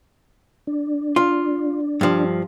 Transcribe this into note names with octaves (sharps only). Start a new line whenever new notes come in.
D4
F4
G2 F3